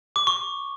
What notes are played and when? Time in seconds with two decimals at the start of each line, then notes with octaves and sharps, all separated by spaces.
0.16 D6
0.27 C#6